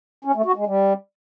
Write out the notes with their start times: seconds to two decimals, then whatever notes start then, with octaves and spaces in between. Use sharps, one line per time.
0.25 C#4
0.35 A3
0.45 F#4
0.56 G#3
0.66 G3